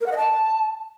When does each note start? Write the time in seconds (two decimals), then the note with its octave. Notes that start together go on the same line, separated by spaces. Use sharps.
0.01 A#4
0.06 F#5
0.12 D#5
0.17 A5